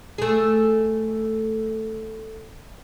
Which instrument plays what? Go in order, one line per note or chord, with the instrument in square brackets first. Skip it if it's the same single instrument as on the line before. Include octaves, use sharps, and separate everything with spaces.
[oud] A3 G#4